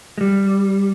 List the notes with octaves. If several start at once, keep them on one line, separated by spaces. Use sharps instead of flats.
G#3
G3